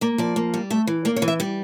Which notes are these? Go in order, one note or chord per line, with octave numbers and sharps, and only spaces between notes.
A#3 D5
F3 D5
A#3
G3
A3 E5
E3
A#3 D5
C#5
E3
E5
G3 D5